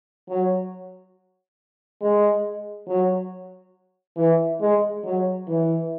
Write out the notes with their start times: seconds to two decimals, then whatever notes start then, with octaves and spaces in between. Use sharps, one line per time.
0.29 F#3
2.02 G#3
2.88 F#3
4.17 E3
4.61 G#3
5.04 F#3
5.47 E3